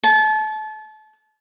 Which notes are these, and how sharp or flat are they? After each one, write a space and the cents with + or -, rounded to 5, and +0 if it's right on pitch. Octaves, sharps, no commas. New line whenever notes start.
A5 -30